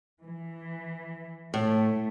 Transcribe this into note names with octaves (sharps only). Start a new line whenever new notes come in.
E3
A2 A3